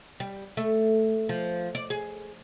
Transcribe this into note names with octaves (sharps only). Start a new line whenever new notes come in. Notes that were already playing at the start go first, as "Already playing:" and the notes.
G3
A3
F3
D5
G#4